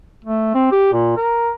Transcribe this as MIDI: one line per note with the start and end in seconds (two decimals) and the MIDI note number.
0.25 0.54 57
0.55 0.68 60
0.72 0.91 67
0.93 1.13 46
1.17 1.51 70